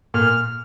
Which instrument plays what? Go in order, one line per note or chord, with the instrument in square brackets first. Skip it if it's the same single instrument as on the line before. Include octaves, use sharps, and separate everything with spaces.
[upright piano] A#2 [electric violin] F6